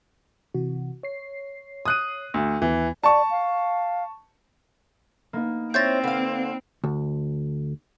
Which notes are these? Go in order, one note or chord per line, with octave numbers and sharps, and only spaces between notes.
C3 E3 F#4
C#5 C7
D#6 F#6 D#7
D2
D#2 E3 B3
D5 A5 C#6
F5
A#3 B3 D#4
C4 E4 C5 C#5 G6 A6 A#6
D3 B4 F5
D2